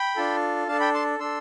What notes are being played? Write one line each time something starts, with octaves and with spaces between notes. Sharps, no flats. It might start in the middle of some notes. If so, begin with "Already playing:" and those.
Already playing: G5 B5
D4 F4 A4
D4 A4 F5 A5
G5 B5
A5 C6
D4 A4 C6 E6